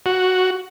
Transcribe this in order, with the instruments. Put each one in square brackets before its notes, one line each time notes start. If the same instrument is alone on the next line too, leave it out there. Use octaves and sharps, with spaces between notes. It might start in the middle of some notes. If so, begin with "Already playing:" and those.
[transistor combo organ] F#4